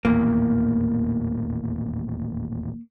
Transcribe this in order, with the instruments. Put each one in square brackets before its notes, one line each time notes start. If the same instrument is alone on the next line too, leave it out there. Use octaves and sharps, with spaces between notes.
[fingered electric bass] D#1 A1 E2 [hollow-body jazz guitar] A#3